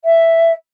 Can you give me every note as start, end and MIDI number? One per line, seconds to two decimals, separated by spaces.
0.04 0.52 76